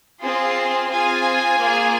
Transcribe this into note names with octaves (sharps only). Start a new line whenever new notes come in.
C4 F4 G#4 C6
C4 F4 G#4 G#5
A#3 F4 G#4